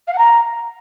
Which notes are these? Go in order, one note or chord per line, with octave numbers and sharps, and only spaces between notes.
F5
F#5
A#5